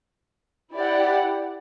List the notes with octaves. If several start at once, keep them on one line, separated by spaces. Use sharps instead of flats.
E4 G4 D5 F#5